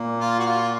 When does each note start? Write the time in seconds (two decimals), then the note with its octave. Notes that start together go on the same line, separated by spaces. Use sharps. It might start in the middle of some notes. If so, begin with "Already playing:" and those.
Already playing: A#2 A#3
0.19 F4
0.39 F#4
0.46 F4